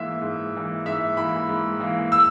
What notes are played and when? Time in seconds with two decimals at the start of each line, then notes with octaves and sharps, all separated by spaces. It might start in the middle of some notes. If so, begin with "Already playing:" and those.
Already playing: G#2 E3 A#3 E5
0.22 G#2
0.54 E3 A#3
0.86 G#2 E5
1.17 E3 A#3 B5
1.49 G#2
1.80 E3 A#3
2.12 E6